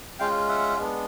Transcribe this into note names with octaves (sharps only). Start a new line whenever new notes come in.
G#3 C#4 F4 F5 G5
E5 F#5
G#3 B3 D4